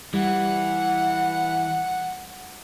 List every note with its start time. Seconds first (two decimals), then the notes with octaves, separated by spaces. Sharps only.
0.14 E3 G3 F#5